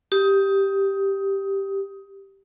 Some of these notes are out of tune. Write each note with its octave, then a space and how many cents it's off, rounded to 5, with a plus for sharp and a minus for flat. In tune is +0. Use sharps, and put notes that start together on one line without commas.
G4 +0 D#6 +20